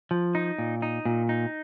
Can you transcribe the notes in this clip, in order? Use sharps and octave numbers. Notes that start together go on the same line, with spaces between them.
F3
D#4
A#2
D#4
A#2
D#4